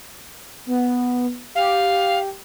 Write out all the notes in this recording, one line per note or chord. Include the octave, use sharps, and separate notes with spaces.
B3
G4 F5